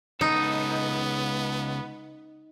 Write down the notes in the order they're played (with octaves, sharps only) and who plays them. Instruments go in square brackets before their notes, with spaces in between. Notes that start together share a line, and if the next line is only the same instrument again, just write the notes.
[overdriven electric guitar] C#2 A4 [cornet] B3 [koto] D#4